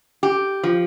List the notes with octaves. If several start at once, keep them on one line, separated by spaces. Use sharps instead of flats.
G4
F3